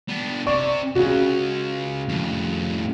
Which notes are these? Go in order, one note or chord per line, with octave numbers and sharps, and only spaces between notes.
B3 D4
C3 D5 C#6
C#2 C#3 F#4
F2 A2